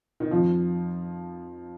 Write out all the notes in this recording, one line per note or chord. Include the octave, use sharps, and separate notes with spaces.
D#3
F2 F3